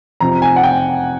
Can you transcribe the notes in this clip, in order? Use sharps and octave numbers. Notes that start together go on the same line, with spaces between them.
F2 C3 F3 A#5
G#5
F#5
G5